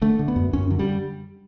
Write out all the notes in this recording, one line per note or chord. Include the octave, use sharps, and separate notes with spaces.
D3 A3
D3
B3
F#2
F#2 C#4
D3 F#3
G3